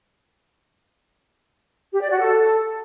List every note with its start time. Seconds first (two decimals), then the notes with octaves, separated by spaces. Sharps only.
1.93 G4
2.02 D5
2.11 F#4
2.20 A4